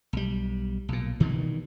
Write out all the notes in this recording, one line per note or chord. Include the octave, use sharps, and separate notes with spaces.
B1 G3
B1 A#2
G2 B2 D#3 E3